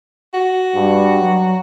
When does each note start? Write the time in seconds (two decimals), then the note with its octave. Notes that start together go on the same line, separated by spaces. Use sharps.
0.34 F#4
0.75 G2
1.19 F#3